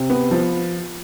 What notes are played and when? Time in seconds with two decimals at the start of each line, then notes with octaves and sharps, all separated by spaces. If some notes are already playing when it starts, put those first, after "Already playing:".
Already playing: C3
0.10 B3
0.31 F3